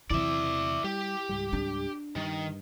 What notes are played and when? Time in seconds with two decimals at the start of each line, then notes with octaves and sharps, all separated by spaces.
0.10 E2 C3 E3 F#3 E4 D5 E5
0.84 G3 G4
1.29 C#2 G#2 G3
1.53 D4
2.16 G2 D#3